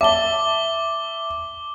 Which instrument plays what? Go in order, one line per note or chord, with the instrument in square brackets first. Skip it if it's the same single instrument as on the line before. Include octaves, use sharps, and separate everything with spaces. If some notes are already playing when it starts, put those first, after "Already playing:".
[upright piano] E5 A5 [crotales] D6 G7